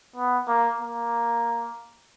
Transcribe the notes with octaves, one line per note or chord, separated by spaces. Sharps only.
B3
A#3
A#3